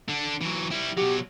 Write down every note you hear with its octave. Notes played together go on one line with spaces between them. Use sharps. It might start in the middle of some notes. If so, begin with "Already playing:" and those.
D3 D4
E3 F#3
G3 E4
B2 F#3 G4